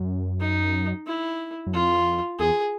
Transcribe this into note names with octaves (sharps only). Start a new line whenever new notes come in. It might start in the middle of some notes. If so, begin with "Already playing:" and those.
Already playing: F#2
D#4
E4
F#2
F2 F4
E2 G#4